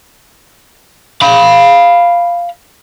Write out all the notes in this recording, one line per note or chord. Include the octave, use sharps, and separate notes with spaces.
F5 B5